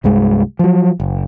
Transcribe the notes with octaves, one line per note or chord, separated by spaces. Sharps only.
C2 G2 G#3
F3 F#3
F#1